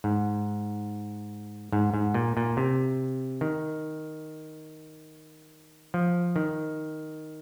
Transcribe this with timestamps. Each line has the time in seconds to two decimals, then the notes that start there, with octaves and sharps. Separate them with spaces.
0.04 G#2
1.72 G#2
1.94 G#2
2.14 A#2
2.37 A#2
2.57 C3
3.41 D#3
5.94 F3
6.36 D#3